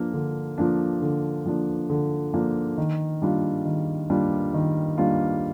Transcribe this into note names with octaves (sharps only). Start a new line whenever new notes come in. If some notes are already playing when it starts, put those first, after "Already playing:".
Already playing: F3 A#3 D4
D3
F3 A#3 D4
D3
F3 A#3 D4
D3
F3 A#3 D4
D#3
G3 A#3 D4 F4
D#3
G3 A#3 D4 F4
D#3
G3 A#3 D4 F4